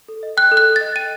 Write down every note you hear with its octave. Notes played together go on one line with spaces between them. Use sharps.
A4
D#5
G5 F#6
A4
F#6
A4
A6
D#5
G5 D#7